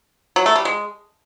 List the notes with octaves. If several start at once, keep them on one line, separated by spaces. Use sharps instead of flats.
F#3
A3
G3
G#3